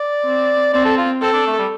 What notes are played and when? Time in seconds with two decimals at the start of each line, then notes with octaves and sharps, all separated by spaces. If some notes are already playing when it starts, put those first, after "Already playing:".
Already playing: D5
0.24 C4
0.73 C4 D5
0.85 A4
0.98 F4
1.21 C4 A4
1.33 D4
1.47 A3
1.59 G3